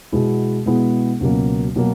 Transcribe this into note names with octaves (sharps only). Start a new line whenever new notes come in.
B2 G#3 B3 E4 G#4
B2 G#3 B3 E4 G#4
C#2 B2 F#3 A#3
B2 F#3 A#3